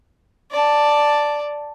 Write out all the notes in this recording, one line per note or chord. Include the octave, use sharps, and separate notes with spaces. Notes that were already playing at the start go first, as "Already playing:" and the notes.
D5 A5